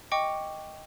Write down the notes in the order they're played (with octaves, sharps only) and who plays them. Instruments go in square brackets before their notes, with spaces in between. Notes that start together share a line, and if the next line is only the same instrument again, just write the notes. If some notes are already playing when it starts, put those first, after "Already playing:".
[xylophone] D#5 G5 C#6 D6 C#7